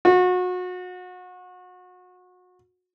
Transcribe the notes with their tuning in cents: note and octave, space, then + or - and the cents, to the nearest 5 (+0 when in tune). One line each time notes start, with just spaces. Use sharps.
F#4 -30